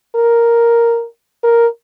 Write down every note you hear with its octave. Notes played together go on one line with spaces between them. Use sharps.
A#4
A#4